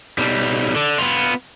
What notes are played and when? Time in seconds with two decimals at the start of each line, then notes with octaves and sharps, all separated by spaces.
0.19 B1 G3
0.76 D3
0.98 B3 F4